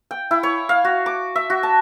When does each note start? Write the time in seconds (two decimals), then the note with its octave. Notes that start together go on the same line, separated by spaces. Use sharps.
0.11 G5
0.31 E4
0.43 C#5
0.69 F5
0.85 F#4
1.06 D6
1.36 E5
1.50 F#4
1.63 A5